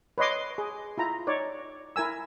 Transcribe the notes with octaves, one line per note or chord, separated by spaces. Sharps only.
B4 C#5 D#5 C6 D6
G#4
E4 F4 A#5
D#4 C#5 D5
E4 A#4 G#5 E6